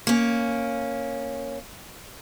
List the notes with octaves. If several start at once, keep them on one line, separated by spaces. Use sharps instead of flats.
A#3 C#4